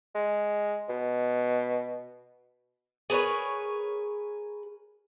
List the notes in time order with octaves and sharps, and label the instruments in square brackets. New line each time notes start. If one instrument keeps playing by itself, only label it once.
[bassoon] G#3
B2
[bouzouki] G#4 A#4 B4 C#5